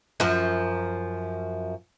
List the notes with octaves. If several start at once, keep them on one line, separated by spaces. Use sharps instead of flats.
F#2 F3